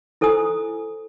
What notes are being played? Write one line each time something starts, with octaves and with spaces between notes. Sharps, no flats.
E4 A4 C5 G#5 D#6